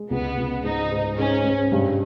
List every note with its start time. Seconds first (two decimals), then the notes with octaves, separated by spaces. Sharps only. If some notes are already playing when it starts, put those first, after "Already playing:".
Already playing: G#3
0.11 C#2 B3
0.38 C#2
0.64 G#2 D#4
0.91 G#2
1.18 G#2 C#4
1.44 G#2
1.72 G2